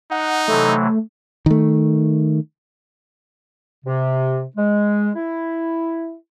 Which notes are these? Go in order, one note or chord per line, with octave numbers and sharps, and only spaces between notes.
D#4 F#5
C3 E3 F#3 A3
D#3 A3
C3
G#3
E4